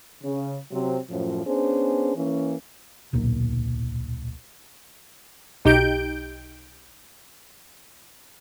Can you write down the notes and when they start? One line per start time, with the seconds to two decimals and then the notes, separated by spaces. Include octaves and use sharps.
0.22 C#3
0.71 C3 F#3 C4
1.09 F#2 A2 F3
1.45 B3 C#4 D4 G#4 C5
2.15 E3 A#3 C#4
3.13 D1 B1 A#2
5.65 B1 D#4 G4 G6 D7